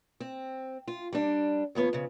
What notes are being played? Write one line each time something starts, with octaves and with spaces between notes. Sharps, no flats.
C4
F4
G3 D4
D#2 F3 B3 C#5
F2 C#3